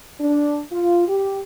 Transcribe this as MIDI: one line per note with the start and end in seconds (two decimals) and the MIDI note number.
0.20 0.61 62
0.72 1.06 65
1.08 1.39 67